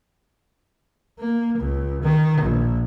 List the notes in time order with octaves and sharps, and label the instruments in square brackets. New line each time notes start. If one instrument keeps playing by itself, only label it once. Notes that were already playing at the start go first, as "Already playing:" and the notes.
[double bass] A#3
C#2
D#3
A#1